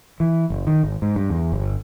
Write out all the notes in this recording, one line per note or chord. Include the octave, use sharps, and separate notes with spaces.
E3
F#1
D#3
G#1
G#2
G2
E2
G1